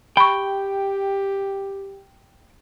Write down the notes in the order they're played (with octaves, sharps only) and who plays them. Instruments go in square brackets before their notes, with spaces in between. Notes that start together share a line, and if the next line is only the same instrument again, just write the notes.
[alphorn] G4 [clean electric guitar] G5 [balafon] B5 C#6